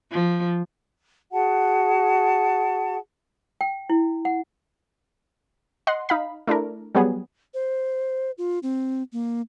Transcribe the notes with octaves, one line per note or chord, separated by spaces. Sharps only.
F3
F#4 G#4 F#5 A5
G5
E4
F#5
D#5 F#5 C6
D#4 F5 B5
A3 D4 E4 A#4
F#3 G3 B3 G#4
C5
F4
C4
A#3